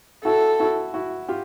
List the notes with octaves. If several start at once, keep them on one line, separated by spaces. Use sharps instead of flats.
E4 F#4 A4
E4 F#4
E4 F#4
F4 G4